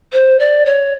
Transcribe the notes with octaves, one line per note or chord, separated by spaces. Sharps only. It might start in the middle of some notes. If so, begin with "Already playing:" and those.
C5
D5
C#5